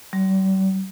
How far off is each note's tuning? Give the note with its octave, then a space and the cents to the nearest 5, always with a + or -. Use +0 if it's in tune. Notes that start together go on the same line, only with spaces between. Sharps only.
G3 -45